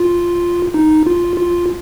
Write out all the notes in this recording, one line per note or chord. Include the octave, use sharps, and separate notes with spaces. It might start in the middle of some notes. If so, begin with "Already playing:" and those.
Already playing: F4
D#4
F4
F4